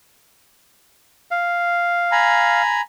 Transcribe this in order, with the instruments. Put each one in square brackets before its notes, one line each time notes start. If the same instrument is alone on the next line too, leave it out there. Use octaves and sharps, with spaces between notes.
[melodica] F5
[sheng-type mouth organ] G#5 A#5 B5